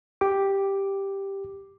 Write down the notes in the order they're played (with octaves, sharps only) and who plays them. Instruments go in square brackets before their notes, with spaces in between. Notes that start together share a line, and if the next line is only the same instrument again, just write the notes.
[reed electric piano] G4 D6